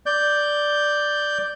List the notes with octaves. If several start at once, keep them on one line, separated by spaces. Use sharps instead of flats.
D5 G6